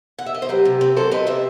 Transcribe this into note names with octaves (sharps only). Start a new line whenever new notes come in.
F#5
E5
D#5
C5
F#3 G4 B4
C3
C4
F#3 A4 C5
C4 B4 D#5
C3 C5 E5